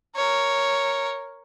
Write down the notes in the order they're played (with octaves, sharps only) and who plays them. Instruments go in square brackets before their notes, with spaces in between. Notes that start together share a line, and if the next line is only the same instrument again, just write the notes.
[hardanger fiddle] A#4 C#5